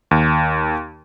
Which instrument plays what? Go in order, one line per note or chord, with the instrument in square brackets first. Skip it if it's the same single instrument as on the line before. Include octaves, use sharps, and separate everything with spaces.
[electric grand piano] D#2